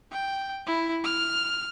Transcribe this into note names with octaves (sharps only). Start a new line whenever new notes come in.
G5
E4
F6